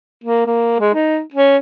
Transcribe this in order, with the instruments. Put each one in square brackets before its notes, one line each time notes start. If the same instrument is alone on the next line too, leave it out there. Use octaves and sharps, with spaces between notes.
[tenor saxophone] A#3
A#3
G#3
D#4
C#4